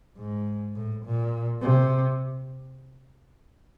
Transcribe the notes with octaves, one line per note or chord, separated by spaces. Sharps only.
G#2
A2
A#2
C3